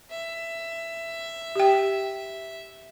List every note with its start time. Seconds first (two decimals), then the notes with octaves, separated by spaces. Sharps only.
0.10 E5
1.55 G4 G5